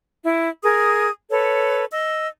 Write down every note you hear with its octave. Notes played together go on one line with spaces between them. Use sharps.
E4
G#4 A#4 D#6
A4 B4 C#5
D#5 E6